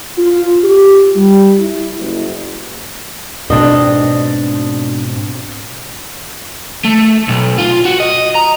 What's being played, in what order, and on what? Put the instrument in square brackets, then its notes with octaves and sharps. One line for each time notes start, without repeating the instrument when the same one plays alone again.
[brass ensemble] F4
G4
G3
E4
F#1
[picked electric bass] G#2 B2 C4 [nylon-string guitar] D4 D#5
[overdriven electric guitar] A3
B1
F4
F#4
D#5
A#5